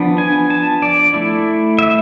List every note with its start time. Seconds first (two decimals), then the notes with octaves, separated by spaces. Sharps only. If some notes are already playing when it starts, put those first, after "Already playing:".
Already playing: F3 B3 D4
0.18 G#5
0.50 A5
0.82 D5
1.14 A3 E4
1.79 E5